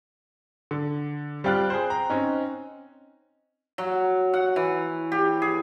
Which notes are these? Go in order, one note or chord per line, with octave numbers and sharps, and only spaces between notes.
D3
G3 C4 F4 G5 F#6
G#4 C5
A#5
C4 C#4 D#4
F#3
F#5
E3
G4
G#4